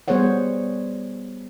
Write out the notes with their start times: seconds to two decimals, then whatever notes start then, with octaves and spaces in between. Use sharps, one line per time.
0.08 G3 B3 G#4 C5 C#5 F#5